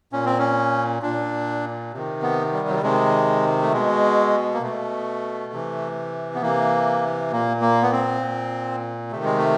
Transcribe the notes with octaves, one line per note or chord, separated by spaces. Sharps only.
A#2 C#4
C4
C#4
A#2 D4
C3 D#3
B3
G3
F#3
G3
C3 D#3 G#3
A3
B2 G#3
A#3
B2 A3
C3 E3
B3
C3 E3 A#3
A#2 A#3
A#3
B3
C4
A#2
C3 D#3 A3
G#3
A3